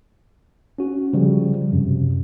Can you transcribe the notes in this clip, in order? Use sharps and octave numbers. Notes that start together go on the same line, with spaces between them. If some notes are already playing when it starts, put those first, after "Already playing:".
C#4 F#4
C#3 F3 G3
F#2 C3